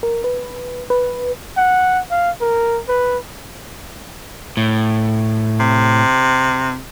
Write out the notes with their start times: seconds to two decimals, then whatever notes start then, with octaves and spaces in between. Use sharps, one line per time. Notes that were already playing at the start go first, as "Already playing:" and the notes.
0.03 A#4
0.24 B4
0.90 B4
1.57 F#5
2.11 F5
2.41 A#4
2.89 B4
4.57 A2
5.59 C3